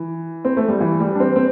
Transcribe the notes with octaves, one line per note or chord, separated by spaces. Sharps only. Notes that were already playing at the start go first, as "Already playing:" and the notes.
Already playing: E3
C4
A3
G3
E3
G3
D4
C4
C4